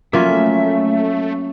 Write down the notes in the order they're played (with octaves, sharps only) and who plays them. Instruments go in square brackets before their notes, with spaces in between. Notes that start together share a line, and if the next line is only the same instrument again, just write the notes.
[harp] F#3 C#4 [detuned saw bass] A3 [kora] A#3 F4 [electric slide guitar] E5